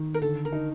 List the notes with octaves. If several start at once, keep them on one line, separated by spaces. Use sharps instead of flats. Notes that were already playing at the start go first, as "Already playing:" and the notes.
Already playing: D#3
A#4
D3 A4
A#4
D#4